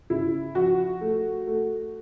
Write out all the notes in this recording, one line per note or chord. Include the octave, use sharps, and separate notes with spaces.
C#3 E4
F3 F#4
A3
A3